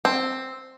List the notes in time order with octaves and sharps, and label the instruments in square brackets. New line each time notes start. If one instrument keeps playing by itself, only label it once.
[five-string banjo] C4